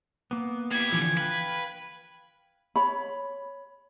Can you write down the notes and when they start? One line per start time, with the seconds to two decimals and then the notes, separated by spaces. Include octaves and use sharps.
0.31 A#3 B3
0.71 G3 E4 G#6
0.92 D3 E3 F3
1.17 B4 F5 G5
2.76 C#5 B5